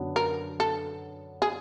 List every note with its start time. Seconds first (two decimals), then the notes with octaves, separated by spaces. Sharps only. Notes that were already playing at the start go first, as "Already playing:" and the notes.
Already playing: F#2 D3 F#3 B3 D4
0.16 A#4
0.60 A4
1.42 G#4